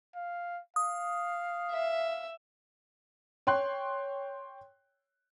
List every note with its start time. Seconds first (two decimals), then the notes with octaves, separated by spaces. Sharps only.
0.15 F5
0.76 F5 D#6
1.71 E5
3.47 C#5 G5 C6 F#6